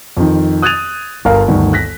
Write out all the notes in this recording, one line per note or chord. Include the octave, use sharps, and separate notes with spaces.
F2 D#3
D#6 F#6 G#6 A6 D#7 F7
G1 A#4 F5
G1 D2 G2 D#3
F#6 A#6 B6